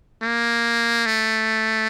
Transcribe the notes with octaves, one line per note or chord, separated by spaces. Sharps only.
A#3
A3